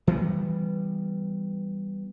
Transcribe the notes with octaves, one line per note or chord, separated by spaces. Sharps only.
E3 G3 B3